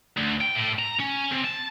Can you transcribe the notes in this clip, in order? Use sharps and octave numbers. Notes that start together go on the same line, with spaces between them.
D2
G5
A2
A#5
C#4
C3
A5